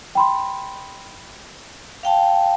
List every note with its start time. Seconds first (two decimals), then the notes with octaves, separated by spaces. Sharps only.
0.15 G5 B5 C6
2.03 F5 G5 A5